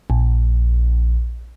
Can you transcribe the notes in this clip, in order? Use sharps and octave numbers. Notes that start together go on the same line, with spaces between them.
A#1